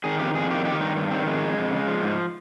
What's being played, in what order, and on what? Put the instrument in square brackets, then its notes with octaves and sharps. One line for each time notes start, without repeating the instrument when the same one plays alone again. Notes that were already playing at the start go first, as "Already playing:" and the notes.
[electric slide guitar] D#3 G#4
F2 G4
F2 G#4
D#3 G4
D#3 G4
G2 D#4
G2
D#3 C4
F2 G#3
F2
F2
C#3
F3
G#2